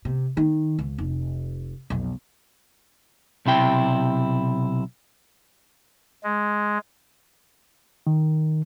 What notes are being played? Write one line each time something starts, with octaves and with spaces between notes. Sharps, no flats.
C3
D#3
C#2
F1
B1 F2
B1 C3 E4 G5
G#3
D#3